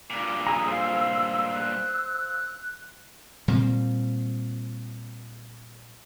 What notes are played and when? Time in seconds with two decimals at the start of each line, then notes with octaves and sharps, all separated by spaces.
0.10 G2 A#2 D6
0.47 G#4 A#5 E6
0.68 C5 F5
1.54 E6 F#6
3.48 A#2 G3 C4